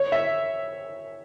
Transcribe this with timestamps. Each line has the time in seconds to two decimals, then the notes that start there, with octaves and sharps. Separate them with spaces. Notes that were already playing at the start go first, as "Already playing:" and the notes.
Already playing: C#5
0.12 E5